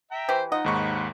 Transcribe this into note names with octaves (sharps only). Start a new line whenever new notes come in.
E5 G5 A#5
E3 G4 C5
F3 D#4 D#5 F#5
D#2 G#2 F#5 B5 C#6